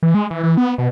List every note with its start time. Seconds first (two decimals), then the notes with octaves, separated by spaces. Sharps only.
0.03 E3
0.14 G#3
0.30 E3
0.43 E3
0.57 B3
0.78 B2